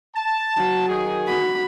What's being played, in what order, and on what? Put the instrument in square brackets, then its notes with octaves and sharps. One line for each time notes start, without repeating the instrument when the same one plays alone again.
[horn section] A5
[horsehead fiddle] F#3
[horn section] D#3 G#4
[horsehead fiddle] F#4 B5